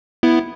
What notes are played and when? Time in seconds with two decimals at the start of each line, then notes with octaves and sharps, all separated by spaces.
0.23 B3 E4